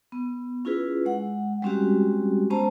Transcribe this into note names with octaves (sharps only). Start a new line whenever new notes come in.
B3
C#4 E4 F4 G#4 B4
G#3 F#5
G3 G#3 C4 C#4 F#4 G4
G#3 B3 C#4 C5 A5 A#5